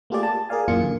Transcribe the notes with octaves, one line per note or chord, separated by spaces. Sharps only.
A3 A#3 F4 G4 G#4 D5
A5
G#4 A#4 D5 F5 G#5
F#2 A#2 E3 A#3 F4 C#7
D3